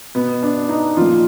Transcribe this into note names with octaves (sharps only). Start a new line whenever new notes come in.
B2 B3
D4
D#4
A#2 F3 F4